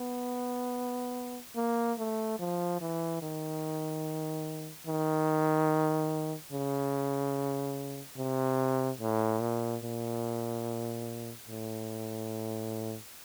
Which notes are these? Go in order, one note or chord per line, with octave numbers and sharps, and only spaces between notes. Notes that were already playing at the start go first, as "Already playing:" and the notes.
Already playing: B3
A#3
A3
F3
E3
D#3
D#3
C#3
C3
A2
A#2
A#2
A2